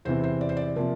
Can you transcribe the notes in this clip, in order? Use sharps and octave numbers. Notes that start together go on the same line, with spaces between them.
E2 C3 E3 C5
C5
D5
C5
D5
C3 F3 A#3